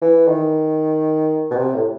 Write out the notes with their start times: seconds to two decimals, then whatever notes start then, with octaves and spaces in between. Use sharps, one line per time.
0.02 E3
0.28 D#3
1.51 B2
1.56 C3
1.74 A2